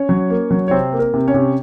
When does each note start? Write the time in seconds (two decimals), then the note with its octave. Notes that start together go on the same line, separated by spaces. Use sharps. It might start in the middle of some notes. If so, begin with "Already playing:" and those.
Already playing: C#4 C#5
0.09 F#3
0.30 A#3
0.51 F#3
0.68 C#5
0.71 C3 C4 C5
0.92 A#3
0.99 A#4
1.14 C3
1.28 C#4 C#5
1.34 C3